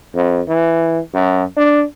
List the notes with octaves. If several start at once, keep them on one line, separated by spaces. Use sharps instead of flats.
F2
E3
F#2
D4